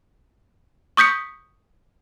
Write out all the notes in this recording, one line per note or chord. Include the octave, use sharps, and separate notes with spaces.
C#6 D#6 G6 B6 C#7